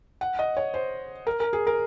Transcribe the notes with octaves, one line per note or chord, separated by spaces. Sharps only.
F#5
D#5
C#5
C5
A#4
A#4
G#4
A#4